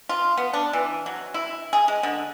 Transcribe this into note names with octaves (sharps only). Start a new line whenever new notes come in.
F4
B3
D4
E3
F#3
E4
G#4
G#3
D3